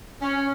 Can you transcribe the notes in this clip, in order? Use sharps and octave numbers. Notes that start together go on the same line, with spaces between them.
C#4